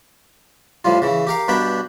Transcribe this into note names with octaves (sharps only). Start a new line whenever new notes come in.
A2 F3 G3 F4
C#3 E3
G4 A#4 F5
G2 B2 D4 G4 G5 B5